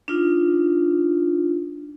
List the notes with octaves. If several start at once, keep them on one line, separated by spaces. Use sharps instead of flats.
D4 D#4 F4